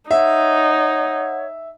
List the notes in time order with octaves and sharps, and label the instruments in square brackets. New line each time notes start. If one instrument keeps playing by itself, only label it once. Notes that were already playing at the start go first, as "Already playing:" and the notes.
[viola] D#4 [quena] C#5 [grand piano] E5 [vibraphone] F#5